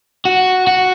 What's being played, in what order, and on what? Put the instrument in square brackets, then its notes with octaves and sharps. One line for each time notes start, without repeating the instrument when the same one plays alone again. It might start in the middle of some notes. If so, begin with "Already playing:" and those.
[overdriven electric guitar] F#4
F#4